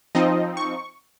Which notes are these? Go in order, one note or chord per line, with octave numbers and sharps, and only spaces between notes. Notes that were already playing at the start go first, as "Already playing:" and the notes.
F3 C4 D#4 D#5
C#6